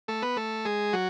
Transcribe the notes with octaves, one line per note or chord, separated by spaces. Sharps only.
A3 A4
B3 B4
A3 A4
G#3 G#4
F#3 F#4